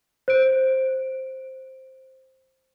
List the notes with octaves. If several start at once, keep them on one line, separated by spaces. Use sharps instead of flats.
C5 D7